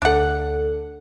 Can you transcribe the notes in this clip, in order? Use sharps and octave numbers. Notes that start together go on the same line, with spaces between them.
D2 D4 A4 F#5